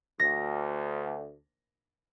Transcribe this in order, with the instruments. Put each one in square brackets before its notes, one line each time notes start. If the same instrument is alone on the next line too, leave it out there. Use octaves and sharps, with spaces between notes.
[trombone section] D2 [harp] A#6